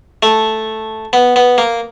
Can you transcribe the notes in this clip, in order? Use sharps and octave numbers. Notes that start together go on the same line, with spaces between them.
A3
B3
B3
A#3